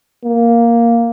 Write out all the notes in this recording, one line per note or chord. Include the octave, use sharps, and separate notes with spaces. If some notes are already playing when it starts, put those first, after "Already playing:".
A#3